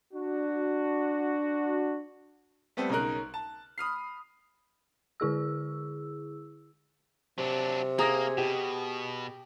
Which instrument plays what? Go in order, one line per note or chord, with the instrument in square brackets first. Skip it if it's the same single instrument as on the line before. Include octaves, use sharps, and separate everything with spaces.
[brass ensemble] D4 F#4
[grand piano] G3 A3 B3 C4 A4
B1 C#3 D#4 A#4 F#6
A5
B5 D#6 F6 C7
[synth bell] D3 E4 G#4 E6
[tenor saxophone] C3 [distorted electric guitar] F#3 D4
[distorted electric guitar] A#3 [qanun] G#4 [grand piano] A#5 D#6 A#6
[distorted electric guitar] B2 [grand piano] G4